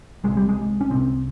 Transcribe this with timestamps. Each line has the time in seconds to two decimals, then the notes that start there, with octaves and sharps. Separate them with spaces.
0.24 C2 C3 G#3
0.37 G3
0.49 G#3
0.81 C#4
0.91 C2 C3 C4